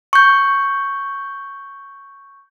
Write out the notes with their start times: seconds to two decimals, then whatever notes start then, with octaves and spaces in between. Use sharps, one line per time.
0.13 C#6 G6